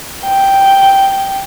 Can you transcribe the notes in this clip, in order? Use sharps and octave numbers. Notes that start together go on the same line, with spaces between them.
G5